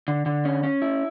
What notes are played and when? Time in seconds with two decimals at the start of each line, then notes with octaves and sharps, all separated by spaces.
0.08 D3
0.26 D3
0.45 C#4
0.63 C#4
0.82 E4